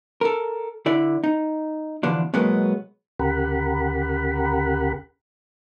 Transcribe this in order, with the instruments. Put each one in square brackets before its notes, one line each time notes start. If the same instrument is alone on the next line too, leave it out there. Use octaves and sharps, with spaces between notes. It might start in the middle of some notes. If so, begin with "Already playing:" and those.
[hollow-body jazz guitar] A4 A#4
D3 E4 D5
D#4
E2 B2 D3 F3 D4
B2 F#3 G#3 A#3 B3
[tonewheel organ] D2 C#3 G4 A#4 F#5 B5